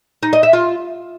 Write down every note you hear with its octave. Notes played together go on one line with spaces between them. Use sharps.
D#4
D#5
E5
F4